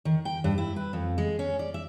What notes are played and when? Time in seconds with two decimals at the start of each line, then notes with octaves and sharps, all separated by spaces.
0.05 D#3
0.25 G5
0.44 G2
0.58 E4
0.76 B4
0.93 F2
1.18 G#3
1.39 C#4
1.59 D5
1.74 E5